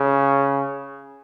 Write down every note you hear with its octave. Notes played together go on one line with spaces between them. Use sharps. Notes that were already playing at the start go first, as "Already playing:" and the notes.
Already playing: C#3